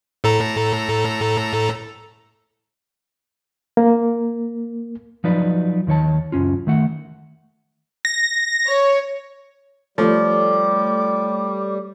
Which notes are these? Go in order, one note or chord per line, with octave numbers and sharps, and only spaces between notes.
A2 A4 A#5
A#3
F3 F#3 D#4 B4 D5
D#2 D#3 C#5 A5
C#2 F#2 A#2 C#4 F4
D#3 A3 F#5
A#6
C#5
F3 G3 A3 A4 C#5 D6